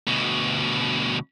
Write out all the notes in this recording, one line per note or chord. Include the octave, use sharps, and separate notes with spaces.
D2 B2